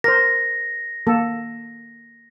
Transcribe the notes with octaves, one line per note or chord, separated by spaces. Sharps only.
A#4 C5 A#6
A#3 A4